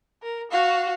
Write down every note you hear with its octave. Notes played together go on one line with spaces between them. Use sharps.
A#4
F#4 F5